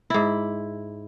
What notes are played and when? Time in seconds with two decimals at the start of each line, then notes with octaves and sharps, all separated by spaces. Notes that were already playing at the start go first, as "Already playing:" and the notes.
0.10 G#2 E4